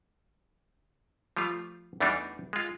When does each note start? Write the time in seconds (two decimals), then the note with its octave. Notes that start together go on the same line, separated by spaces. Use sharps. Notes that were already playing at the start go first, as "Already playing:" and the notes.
1.37 F3 G3 A3 F4
2.00 E2 E3 G3 A3 D4 D#4
2.53 G#3 F4